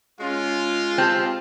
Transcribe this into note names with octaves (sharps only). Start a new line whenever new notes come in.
G#3 C#4 F4
C4 G4 A5